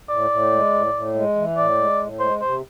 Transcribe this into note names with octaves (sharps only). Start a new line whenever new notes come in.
A2 D5
A2
G#3
A2
A2
G#3
E3
A2 D5
G#3
A2
G#3 C5
C3 C5